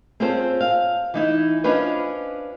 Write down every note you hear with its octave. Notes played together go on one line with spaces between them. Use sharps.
C4 C#4 F4 G#4 A4 C5
F5
E3 D#4 E4
C#4 D4 F4 B4 C5 D#5